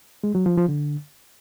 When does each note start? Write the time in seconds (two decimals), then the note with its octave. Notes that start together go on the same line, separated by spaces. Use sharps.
0.24 G#3
0.35 F#3
0.46 F3
0.57 F3
0.68 D3